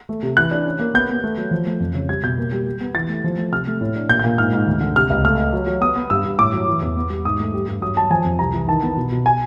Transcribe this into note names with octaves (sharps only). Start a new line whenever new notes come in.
A3
C3
E3 F#6
D4
C#4
A#3
B3 G6
B3
A3
F#3
F3
A3
F2
C#3
G3 G#6
B2 G6
A#3
G3
G3
B3
E3 A6
A3
F3
A3
C3 F6
A3
A2
D4
A#2 G6
G6
A#2
G#2 F6
G#2
D2
D3
C3 F6
C#2
A3 F6
A3
F#3
F#3
B3 D#6
B3
G2 E6
G2
A2 D6
F#3
E3
E2
B3
G3
G#2 D#6
A3
G3
G2
F#3 D#6
F#3 A5
F3 G#5
F2
C2 A#5
E3
D#3 A5
B3
B2
B2
G#5